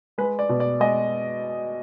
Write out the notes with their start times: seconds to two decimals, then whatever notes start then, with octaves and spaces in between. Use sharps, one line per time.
0.18 G#3 B4
0.39 D5
0.49 B2
0.60 D5
0.80 G#3 D#5